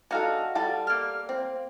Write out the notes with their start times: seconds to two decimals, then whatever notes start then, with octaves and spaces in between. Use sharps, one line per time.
0.11 D4 D#4 F#4 A4 F5
0.55 G3 A4 A5
0.87 A#3 F6
1.29 C4